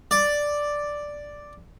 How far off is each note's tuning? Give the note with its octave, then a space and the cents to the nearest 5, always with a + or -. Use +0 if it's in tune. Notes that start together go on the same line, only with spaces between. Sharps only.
D5 +0